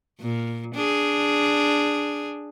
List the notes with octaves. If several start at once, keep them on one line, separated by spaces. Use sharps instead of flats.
A#2
D4 G#4